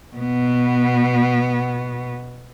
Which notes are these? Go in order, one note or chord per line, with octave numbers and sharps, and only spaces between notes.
B2 B3